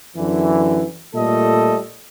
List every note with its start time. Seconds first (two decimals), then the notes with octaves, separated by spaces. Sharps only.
0.15 F#2 D3 E3
1.15 A#2 G3 A3 A4 D#5